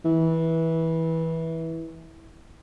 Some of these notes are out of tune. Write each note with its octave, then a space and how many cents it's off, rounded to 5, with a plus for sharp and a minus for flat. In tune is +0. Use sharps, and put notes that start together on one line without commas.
E3 -20